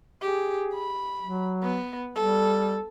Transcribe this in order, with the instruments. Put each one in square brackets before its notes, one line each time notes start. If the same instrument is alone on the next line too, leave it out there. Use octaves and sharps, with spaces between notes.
[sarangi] G4 [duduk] G#4
[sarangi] B5
[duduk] F#3
[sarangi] B3
[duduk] G3 [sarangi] A4